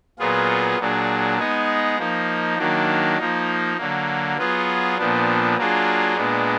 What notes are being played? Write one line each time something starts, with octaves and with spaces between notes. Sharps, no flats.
A#2 F#3 B3 F4 G#4
A#2 F#3 D4 G#4
G#3 B3 D#4 G#4
F3 A#3 D#4
D#3 F#3 A#3 D4
F3 A#3 D#4
D3 F#3 A#3
F#3 B3 F4 G#4
A#2 F3 B3 D4
F#3 A#3 D4 F4 G#4
A#2 G#3 B3 D4